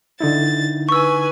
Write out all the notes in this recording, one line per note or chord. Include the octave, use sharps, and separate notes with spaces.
D3 D#4 E4 A6
B4 G#5 C#6 E6